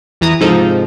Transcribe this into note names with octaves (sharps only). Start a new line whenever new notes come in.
E2 E3 A#5 D#6
G#2 C3 F3 D#4 A4